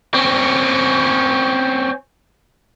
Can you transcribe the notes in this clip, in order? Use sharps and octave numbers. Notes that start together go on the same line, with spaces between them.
C4 C#4